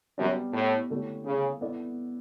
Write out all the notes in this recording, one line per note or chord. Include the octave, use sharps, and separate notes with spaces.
F#2 G3 B3 D4
A2
D3 A3 E4 G4 C#5
C#3
B3 E4 A4 D5